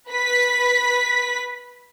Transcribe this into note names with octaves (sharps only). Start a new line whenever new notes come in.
B4 B6